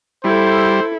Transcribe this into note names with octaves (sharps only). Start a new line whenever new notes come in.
G3 E4 A4 C5